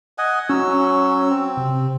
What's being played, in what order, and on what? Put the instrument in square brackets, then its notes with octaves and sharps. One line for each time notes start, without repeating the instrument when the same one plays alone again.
[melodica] D#5 F#5 G#5
[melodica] F#3 F#4 E6 [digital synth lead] C#4
[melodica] C4
[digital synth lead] C3